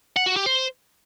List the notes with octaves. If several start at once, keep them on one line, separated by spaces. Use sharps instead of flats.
F#5
F#4
G4
C5